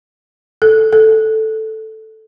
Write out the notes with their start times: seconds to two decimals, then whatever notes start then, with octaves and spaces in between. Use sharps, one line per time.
0.62 A4
0.93 A4